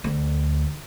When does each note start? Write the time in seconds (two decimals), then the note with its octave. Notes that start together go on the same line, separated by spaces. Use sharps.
0.04 D2